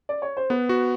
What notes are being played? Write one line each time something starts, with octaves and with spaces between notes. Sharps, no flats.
D5
C#5
C5
B3 B4
F#4